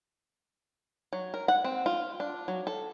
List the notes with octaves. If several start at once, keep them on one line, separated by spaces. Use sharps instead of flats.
F#3
A#4
F#5
C4
F4
D4
F#3
A4